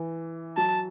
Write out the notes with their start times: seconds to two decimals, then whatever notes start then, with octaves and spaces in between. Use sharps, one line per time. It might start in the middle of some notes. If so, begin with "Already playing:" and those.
Already playing: E3
0.57 F#3 A5